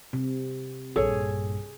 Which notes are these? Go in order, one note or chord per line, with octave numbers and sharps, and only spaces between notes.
C3
A#1 G2 G#4 A4 C#5